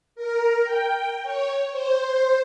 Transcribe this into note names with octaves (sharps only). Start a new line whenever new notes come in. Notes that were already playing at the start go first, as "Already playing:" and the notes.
A#4
G5
C#5
C5